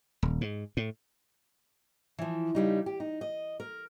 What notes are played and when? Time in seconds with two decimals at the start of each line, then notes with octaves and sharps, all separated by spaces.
0.23 D#1
0.41 G#2
0.77 A2
2.19 E3 F3
2.55 C#3 G3 D#4
2.86 G4
3.00 D#4
3.21 D#5
3.60 A#4